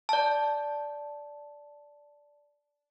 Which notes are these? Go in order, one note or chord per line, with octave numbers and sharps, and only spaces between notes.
D5 A5